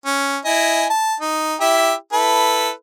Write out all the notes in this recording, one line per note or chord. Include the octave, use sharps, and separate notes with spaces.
C#4
E4 D#5 G#5
A5
D#4
E4 G4 E5
E4 A4 B4